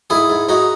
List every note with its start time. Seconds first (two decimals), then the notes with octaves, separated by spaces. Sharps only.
0.10 G#2 E4 G#4
0.30 G#2
0.49 G#2 D#4 F#4